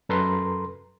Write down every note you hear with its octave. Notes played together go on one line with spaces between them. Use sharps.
F#2 A4 B4 A#5 C6